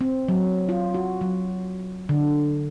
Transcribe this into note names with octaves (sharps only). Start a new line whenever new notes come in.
C4
F#3
F4
F#4
F#3
D3